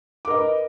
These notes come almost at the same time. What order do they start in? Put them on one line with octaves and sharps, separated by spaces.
D6 A#4 D#5 B4